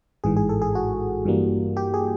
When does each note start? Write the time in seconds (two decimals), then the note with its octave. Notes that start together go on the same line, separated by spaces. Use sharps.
0.24 A1 G#2 E3 G#4
0.37 G#4
0.49 A4
0.62 G#4
0.75 F#4
1.25 G2 E3 G3 A#3
1.77 G4
1.94 G#4